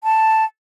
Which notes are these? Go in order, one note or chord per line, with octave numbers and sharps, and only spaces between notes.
A5